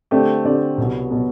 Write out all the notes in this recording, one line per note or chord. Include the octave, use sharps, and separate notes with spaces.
D3 A3 C4 G4 D5
D3 A3 C4 G4 D5
C2 B2 F#3 B3
B2 F#3 B3